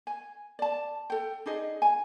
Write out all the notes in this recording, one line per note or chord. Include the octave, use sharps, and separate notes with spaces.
G#5
D5 A5
A4 G5
D4 D#4 G#4 D#5
G#5